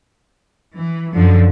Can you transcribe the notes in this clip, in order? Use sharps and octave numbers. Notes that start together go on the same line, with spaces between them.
E3
F#2 D3 F3